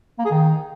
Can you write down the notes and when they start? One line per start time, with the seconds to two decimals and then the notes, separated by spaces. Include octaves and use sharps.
0.19 A#3
0.25 G#4
0.31 D#3